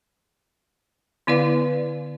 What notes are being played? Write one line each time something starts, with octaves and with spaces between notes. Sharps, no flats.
D3 B3 E4 B4 D5 F5